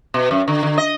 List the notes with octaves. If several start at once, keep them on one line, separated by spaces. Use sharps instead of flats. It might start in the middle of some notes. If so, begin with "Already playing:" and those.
B2
F#2
D3
D3
D#5